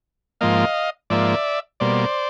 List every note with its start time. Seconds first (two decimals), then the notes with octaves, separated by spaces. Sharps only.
0.41 G#2 F3 A#3 D#5 F5
1.10 G#2 F3 A#3 D5 E5
1.80 B2 G3 A#3 C5 D5